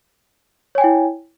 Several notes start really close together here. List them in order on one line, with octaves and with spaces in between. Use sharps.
C#5 G#5 G5 E4